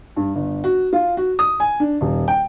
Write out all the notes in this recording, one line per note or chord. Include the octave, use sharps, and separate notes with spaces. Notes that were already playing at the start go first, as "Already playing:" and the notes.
G2
G1
F#4
F4
F#4
D#6
G#5
D4
D#1
G5